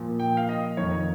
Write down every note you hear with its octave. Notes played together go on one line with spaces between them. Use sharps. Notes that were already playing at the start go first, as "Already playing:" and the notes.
Already playing: A#2 F3
G5
F5
D#5
F2 D#3 C#5